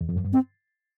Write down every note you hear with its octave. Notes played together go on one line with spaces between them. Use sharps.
E2
F2
F#2
G2
C4